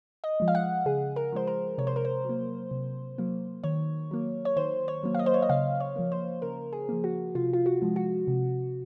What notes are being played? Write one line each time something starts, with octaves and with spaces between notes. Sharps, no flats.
D#5
F3 G#3
F5
F#5
C#3 G#4
A#4
F3 G#3 C5
A#4
C3 C#5
C5
A#4
C5
F#3 A#3
C3
F#3 A#3
D#3 C#5
F#3 A#3
C#5
D#3 C5
C#5
F#3 A#3
F5
D#5
C5
C#5
D#5
C#3 F5
C#5
F3 A#3
C5
C#3 A#4
G#4
F3 A#3
F#4
C3 F4
F4
F#4
F3 G#3
F#4
C3